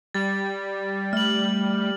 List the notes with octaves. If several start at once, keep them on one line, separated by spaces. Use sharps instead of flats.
G3 A6
A3 F6 F#7